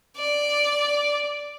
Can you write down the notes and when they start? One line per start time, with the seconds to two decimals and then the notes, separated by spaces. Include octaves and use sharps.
0.17 D5